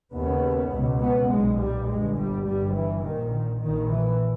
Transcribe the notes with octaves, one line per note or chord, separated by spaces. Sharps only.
D#2 C#3 B3
C#2 B2
B3
B1 A#2 G#3
G3
G1 G2 G#3
G3
G1 G2 G3
E3
A#1 A#2 D#3
D#3
A#1 A#2 D#3
E3